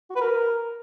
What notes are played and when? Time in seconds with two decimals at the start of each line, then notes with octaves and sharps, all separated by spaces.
0.10 F#4
0.16 B4
0.21 A#4